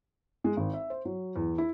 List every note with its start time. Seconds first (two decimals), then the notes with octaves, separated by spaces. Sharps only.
0.44 G#3
0.57 G#1
0.74 E5
0.90 C5
1.05 F#3
1.36 E2
1.58 E4